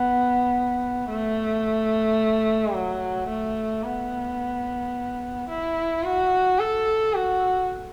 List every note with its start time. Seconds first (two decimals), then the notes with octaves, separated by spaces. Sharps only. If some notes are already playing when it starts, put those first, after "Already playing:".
Already playing: B3
1.09 A3
2.74 F#3
3.28 A3
3.84 B3
5.49 E4
6.04 F#4
6.59 A4
7.14 F#4